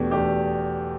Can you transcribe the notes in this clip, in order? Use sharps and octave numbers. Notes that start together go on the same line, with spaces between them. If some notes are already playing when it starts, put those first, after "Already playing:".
Already playing: E2 B2 A3 D4 G4
E2 B2 A3 D4 G4